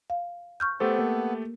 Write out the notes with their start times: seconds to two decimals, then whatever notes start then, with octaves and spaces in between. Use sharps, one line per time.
0.10 F5
0.60 C#6 F6 G6
0.80 A3 B3 G4 A4 C5
0.99 A#3